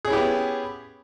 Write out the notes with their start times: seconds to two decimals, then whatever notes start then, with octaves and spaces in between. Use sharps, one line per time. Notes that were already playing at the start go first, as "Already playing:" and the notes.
0.05 G#4
0.07 C#4
0.10 E4
0.13 G4
0.16 B3